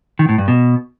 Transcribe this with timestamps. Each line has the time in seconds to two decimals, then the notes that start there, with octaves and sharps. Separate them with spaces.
0.19 D#3
0.29 A2
0.38 G2
0.48 B2